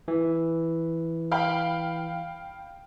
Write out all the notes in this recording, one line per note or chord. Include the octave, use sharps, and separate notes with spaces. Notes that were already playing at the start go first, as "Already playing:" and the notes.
E3
F5 G5 B5